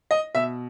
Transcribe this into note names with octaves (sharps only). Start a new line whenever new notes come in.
D#5
B2 E5